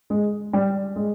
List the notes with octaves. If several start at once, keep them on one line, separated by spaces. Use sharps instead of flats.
G#3
G3
G#3